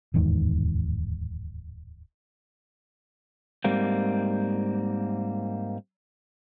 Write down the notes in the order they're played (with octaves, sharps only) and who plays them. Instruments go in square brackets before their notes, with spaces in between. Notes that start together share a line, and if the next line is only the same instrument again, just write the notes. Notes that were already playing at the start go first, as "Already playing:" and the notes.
[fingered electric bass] D1 E2 G#2 D#3
[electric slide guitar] G#2 G3 A#3 C4